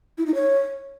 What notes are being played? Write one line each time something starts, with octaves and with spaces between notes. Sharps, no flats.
E4
D#4
C#5